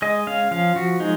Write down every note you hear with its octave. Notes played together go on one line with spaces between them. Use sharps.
G#3 D#5
C#4 F5
F3 F5
F3 F#4
G#3 D#4